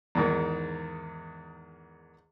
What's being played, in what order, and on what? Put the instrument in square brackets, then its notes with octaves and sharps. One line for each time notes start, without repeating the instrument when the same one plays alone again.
[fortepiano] E2 G#2 D#3